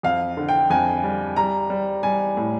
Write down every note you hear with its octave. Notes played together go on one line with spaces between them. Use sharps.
F2 F5
D3
G5
F2 G#5
G3
G3 A#5
G3
G3 G#5
A2